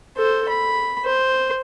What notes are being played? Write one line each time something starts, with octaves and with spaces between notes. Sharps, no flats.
A4 C5
B5
C5